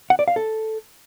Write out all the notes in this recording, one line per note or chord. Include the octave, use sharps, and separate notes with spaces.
F#5
D5
F5
A4